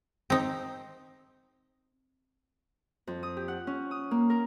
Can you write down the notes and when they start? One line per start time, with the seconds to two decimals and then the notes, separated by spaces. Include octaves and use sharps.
0.30 C4 D#4
3.07 F2
3.23 D#6
3.37 G4
3.48 F#5
3.67 C#4
3.91 D#6
4.11 A#3
4.30 A#4